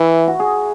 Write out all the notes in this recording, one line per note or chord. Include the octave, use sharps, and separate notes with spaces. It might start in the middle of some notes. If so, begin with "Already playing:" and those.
Already playing: E3 E4
F#4
G#4